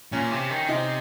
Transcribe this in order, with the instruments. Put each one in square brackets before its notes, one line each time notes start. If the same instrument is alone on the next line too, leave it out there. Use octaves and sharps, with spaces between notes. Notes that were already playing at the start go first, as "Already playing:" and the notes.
[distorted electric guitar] A#2 [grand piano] C#4
[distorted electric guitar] C3
D#3
[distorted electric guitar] C3 [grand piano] D#4